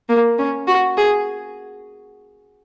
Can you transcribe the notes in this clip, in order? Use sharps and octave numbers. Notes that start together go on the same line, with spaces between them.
A#3
C#4
F#4
G#4